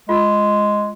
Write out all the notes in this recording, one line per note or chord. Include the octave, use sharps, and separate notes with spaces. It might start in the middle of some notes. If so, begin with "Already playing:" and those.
G#3 F4